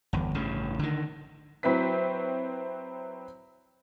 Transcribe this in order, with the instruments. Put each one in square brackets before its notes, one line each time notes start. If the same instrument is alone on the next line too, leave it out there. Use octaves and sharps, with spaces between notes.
[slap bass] G1 E2
A1 G2 C#3
D3 D#3
[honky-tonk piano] F#3 C4 E4 B4 B6